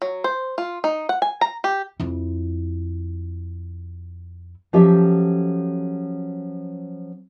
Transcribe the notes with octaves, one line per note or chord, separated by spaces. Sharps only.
F#3
C5
F4
D#4
F#5
G#5
A#5
G4
F2 E4
F3 F#3 C#4 G4 A4 E5